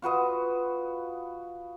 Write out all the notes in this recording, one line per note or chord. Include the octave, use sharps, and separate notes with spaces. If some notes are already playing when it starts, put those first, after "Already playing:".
F4 F#4 B4 D#5